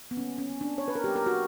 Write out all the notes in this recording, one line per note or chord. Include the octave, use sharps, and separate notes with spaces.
B3
D3 G3 A#3 C#4
C#4
D4
C#5
B4
A#4
B2 F#3 A#3 G4
A#4
F#4